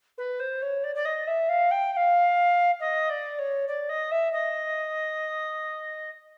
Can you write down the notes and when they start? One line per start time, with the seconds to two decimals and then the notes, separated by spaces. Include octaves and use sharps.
0.18 B4
0.39 C5
0.62 C#5
0.83 D5
0.95 D5
1.05 D#5
1.27 E5
1.49 F5
1.71 G5
1.92 G5
1.96 F5
2.80 D#5
3.09 D5
3.38 C#5
3.67 D5
3.89 D#5
4.11 E5
4.33 D#5